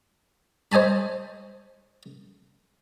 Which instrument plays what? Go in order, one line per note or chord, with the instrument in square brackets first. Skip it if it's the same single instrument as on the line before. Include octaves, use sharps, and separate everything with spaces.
[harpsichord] C5 D#5 G#5 A5 B5